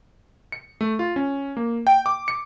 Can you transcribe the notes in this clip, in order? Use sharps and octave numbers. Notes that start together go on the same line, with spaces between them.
C#7
A3
F4
C#4
A#3
G5
D6
C#7